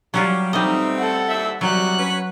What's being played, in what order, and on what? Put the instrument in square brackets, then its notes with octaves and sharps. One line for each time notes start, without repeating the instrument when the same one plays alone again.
[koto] F#3 C#4 F4 [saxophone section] G3
[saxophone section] B2 A3 C4 [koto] G3 D#5 [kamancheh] D#4
[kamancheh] A4 F#5
[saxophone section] D#2 C4 E5
[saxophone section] C3 G3 [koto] F#3 [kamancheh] F#4 F#6
[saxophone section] C#4 B4